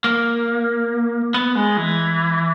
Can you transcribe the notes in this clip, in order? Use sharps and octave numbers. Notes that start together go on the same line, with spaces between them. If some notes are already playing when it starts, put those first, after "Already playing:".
A#3
B3
G#3
E3